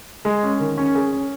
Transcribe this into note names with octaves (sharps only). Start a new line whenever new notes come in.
G#3
C#4
D#3
C#4
G#4
C#4